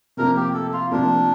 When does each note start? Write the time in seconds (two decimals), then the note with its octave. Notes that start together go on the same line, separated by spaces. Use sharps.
0.17 C3 F3 A#3 A#4
0.36 G4
0.54 A4
0.73 F4
0.91 C3 F3 A#3 D4